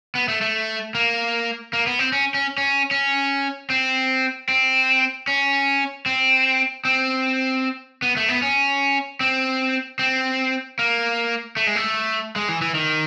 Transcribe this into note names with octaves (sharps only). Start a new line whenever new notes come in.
B3
A3
A3
A#3
A#3
B3
C4
C#4
C#4
C#4
C#4
C4
C4
C#4
C4
C4
B3
A3
B3
C#4
C4
C4
A#3
A3
G#3
A3
G#3
E3
E3
D#3